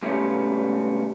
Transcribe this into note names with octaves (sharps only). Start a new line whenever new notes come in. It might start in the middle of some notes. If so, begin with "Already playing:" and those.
G#2 C3 G3 A3 B3 C#4